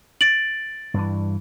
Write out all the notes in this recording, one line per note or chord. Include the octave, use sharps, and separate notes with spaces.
A6 D7 F#7
G2 E3